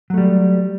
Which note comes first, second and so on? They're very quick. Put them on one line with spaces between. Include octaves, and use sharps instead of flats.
F#3 A3 G3